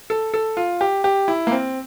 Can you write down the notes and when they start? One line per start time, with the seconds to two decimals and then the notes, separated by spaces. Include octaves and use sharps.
0.10 A4
0.34 A4
0.57 F4
0.81 G4
1.04 G4
1.28 E4
1.47 A#3
1.52 C4